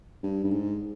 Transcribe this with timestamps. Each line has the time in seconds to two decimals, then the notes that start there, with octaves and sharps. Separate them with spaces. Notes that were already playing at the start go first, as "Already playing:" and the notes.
0.23 G2
0.44 G2
0.51 G#2